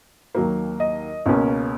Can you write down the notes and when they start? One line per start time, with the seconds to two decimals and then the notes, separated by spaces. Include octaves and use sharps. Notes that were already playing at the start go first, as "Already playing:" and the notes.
0.35 D#2 D#3 F#3 A#3
0.80 D#5
1.26 C#2 B2 A#3 C#4